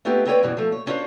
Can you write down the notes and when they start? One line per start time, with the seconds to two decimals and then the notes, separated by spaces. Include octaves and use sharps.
0.05 A3 B3 C4 D#4 F4 G4
0.26 C4 F4 B4 C#5 D5 G5
0.43 F#2 B2 E3 G3
0.57 F3 A3
0.72 C#5
0.86 B3 C#4 D4 F4 C5 C#5